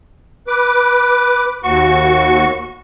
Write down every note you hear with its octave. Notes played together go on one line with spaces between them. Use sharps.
B4 D6
D#2 F#4 C#6